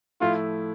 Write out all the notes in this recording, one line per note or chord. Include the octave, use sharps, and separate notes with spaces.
A2 F3 A3 E4 F4